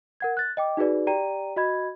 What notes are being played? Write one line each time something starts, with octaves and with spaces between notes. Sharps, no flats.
A#4 F#5 G#6
F#6 A6
D#5 G5 D6
D#4 F#4 G#4 B4 D5
G4 D5 G5 A#5 D#7
F#4 D#5 B5 G#6